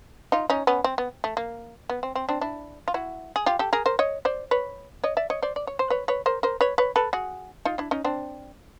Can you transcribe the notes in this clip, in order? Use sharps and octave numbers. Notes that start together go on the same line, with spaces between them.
D#4 F4
C#4 D#4
B3 C#4
C4
B3
A3
A#3
B3
C4
C4
C4 D4
D4 E4
F4
E4 F#4
G#4
F4 G4
G4 A4
G#4 A#4
A#4 C5
C#5 D#5
C5 D5
B4 C#5
C#5 D#5
D5 E5
C#5 D#5
C5 D5
D5
C#5
C5
B4 C#5
B4 C#5
A#4 C5
A#4 C5
B4 C#5
B4 C#5
A4 B4
F#4 G#4
D#4 F4
D4 E4
C#4 D#4
C4 D4